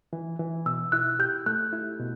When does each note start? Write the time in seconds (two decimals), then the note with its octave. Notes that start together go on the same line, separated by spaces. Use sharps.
0.13 E3
0.39 E3
0.66 B2 E6
0.92 E4 F#6
1.19 G4 G6
1.46 A3 F#6
1.73 E4
1.99 B2